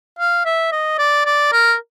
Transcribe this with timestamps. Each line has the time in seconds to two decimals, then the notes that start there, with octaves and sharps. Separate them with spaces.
0.19 F5
0.45 E5
0.72 D#5
0.99 D5
1.25 D5
1.52 A#4